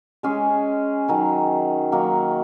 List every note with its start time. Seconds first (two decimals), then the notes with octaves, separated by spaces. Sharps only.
0.23 G#3 C#4 G#4
1.08 D#3 F#3 C#4
1.92 D#3 F#3 A#3